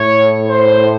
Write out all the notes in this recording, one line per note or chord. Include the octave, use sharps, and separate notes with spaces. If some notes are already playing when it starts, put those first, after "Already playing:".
Already playing: A2 C#5
C5